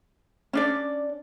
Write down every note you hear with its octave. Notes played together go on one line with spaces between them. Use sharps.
C#4 D4 D5